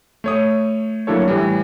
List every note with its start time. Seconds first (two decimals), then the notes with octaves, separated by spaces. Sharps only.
0.24 A3 C#5 D#6
1.07 F#3 A#3 D4 E4 A4 C#5
1.28 A2 E3 G3